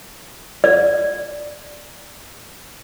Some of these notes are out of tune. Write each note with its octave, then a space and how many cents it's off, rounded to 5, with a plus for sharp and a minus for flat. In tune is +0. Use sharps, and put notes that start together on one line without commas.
D5 +5